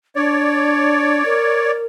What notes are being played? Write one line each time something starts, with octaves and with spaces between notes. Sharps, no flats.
D4 C#5 D5
A#4